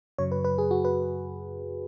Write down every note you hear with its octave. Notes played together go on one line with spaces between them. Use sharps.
F#2 C#3 F#3 C#5
B4
B4
G#4
F#4
B4